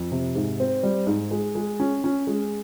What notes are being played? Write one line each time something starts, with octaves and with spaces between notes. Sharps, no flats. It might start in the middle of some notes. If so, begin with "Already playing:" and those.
Already playing: F2
C3
G#2
C4
G3
G#2
G#3
G#3
C#4
C#4
G#3